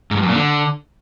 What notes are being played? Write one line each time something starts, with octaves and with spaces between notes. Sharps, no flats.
G#2
G2
F#2
A#2
D3